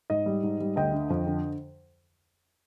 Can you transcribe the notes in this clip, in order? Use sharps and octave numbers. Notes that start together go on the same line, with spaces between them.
G#2 D#5
G3
G#2
G3
D2 D#5 G5
D3
F2
D3